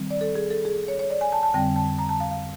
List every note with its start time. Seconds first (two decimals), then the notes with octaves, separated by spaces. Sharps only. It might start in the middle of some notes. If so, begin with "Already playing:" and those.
Already playing: D#3 G3 C4
0.11 D5
0.21 A4
0.36 G#4
0.51 A4
0.65 G#4
0.88 C#5
0.99 C#5
1.10 D5
1.21 G#5
1.32 A5
1.43 A5
1.54 F2 D3 G3 C4 G5
1.76 A5
1.98 A#5
2.09 A5
2.20 F5
2.31 F5